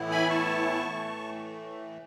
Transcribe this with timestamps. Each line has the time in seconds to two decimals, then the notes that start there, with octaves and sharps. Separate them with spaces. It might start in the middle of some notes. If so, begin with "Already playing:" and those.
Already playing: A2 E3 B3 E4
0.11 G#5 B5
0.30 A5 C#6
0.86 A2 E3 A3